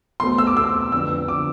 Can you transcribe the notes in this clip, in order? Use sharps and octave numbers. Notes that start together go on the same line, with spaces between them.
E2 B2 A3 C4 C6
E6
D6
E2 B2 A3 C4 E6
F2 D3 F3 B3 E6
D3 F3 B3 D6